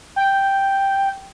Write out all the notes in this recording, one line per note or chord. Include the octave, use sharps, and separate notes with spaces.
G5